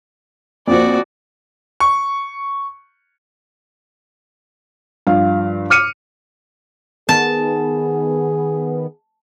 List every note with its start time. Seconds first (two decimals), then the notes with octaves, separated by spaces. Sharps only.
0.68 F2 F3 A#3 F#4 D5
1.80 C#6
5.07 G2 F3 F5
5.70 D6 F6 C#7 D#7
7.09 D#3 B3 G#4 A5